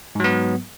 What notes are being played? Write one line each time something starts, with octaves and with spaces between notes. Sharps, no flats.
G#2 F#3 B3